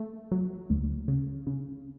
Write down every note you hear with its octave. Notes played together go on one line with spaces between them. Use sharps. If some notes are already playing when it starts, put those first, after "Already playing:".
Already playing: A3
F#3
D2
C#3
C#3